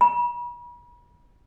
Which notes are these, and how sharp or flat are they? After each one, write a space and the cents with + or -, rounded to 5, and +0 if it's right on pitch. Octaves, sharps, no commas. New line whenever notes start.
B5 -40